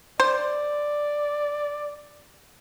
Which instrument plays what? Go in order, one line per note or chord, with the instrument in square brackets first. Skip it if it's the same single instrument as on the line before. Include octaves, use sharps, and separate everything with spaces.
[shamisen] C5 [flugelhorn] D5